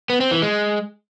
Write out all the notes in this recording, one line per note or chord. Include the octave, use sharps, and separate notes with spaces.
B3
C4
E3
G#3